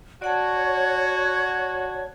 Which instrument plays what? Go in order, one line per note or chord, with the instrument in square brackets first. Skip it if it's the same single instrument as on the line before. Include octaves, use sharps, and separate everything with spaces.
[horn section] F#4 [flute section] C#5 [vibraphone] D5 F#5 A5